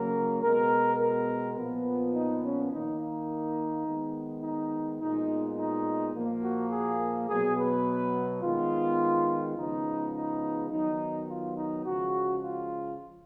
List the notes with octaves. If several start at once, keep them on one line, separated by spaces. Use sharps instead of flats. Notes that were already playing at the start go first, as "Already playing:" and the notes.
Already playing: C#3 F#3 A#3 A#4
B2 G#3 B3 A#4
A#4
A#2 F3 B3
D#4
C#4
D#3 A#3 D#4
D#4
D#3 G#3 B3
D#4
A#2 G#3 B3 D#4
D#4
A#2 F3 A#3
F#4
G#4
B2 F#3 B3 G#4
B4
D#3 G#3 B3 F4
C#3 F3 G#3 B3 D#4
D#4
D#3 F#3 B3 D#4
F4
D#4
C#3 F3 G#3 F#4
F4